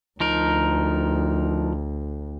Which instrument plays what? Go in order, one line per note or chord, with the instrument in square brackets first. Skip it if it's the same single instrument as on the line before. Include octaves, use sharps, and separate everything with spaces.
[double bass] D2 [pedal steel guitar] F3 D#4 A#4